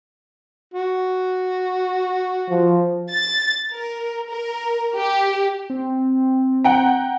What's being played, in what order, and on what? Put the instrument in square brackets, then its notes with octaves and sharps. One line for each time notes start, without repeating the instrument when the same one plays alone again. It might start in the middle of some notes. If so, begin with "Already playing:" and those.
[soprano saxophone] F#4
[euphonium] F3
[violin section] A6
A#4
A#4
G4
[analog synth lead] C4
[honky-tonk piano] F#5 G5 A#5